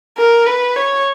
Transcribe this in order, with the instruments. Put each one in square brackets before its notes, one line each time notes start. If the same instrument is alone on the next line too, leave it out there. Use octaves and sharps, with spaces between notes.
[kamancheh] A#4
B4
C#5